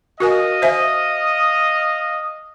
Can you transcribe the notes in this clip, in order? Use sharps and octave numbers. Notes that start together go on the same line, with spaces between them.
F#4 A#4 D#5 F5 G#5 D#6
C5 E5 G#5